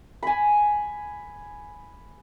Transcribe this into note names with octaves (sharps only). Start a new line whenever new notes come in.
G#5 B5